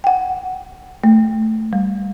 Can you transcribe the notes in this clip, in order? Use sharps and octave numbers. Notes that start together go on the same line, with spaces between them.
F#5 G5
A3
G3